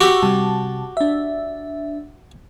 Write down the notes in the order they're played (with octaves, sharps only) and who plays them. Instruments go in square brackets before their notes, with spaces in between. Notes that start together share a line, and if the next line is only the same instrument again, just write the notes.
[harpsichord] F#4 G4 [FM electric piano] C#6 E6
[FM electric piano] C3 G3 A5
D4 E5